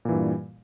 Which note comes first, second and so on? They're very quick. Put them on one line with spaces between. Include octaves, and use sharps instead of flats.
A#2 E3 G2 G3